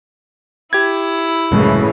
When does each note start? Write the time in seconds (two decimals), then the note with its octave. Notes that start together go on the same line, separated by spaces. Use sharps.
0.73 E4 G4 G#6
1.52 C2 F#2 A2 C#3 E3 G#3